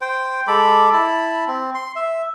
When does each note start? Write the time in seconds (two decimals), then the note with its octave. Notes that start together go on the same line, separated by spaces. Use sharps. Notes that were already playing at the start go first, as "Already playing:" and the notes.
0.01 C5 G5
0.48 G#3 A4 B5 D6
0.93 E4 A5 B5
1.47 C4
1.75 C6
1.96 E5